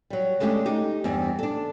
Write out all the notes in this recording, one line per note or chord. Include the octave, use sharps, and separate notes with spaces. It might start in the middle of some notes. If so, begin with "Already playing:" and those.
F#3 G3
G#3 A3 C#4 D4 F#4 G4
D#4 G4
E2 G2 C4
D4 A4